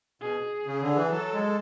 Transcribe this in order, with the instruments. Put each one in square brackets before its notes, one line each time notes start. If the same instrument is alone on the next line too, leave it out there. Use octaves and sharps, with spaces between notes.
[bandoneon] B2 [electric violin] G#4
[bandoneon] C#3
D3
E3
[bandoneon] F#3 [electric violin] A4
[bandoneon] G#3